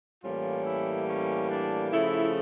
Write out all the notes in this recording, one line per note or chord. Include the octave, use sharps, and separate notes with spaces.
A2 E3 G3 A#3 C#4 F4
E4
C#4
D4
C#3 F3 A3 E4